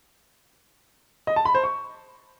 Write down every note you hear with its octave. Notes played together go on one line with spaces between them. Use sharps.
D#5
A5
B5
C5
C#6